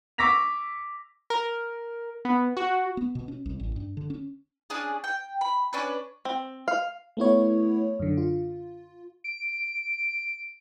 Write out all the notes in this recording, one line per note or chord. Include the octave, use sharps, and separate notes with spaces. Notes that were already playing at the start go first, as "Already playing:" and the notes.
C#6 D6 E6 A#6 B6 F7
A#4
B3
F#4
B3
B2
C#4
C2
A1
G2
D3
C#4
C#4 D4 G#4
G5
B5
C#4 D4 B4
C4
F5
A3 B3 E4 C#5
F#2 D3
F4
D7